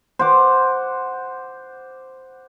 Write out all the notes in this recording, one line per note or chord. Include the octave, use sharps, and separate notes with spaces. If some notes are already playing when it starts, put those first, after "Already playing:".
C5 F#5 D6